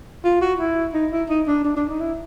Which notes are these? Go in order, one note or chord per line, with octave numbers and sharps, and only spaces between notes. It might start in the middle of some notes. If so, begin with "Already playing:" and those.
F4
F#4
E4
D#4
E4
D#4
D4
D4
D4
D#4
E4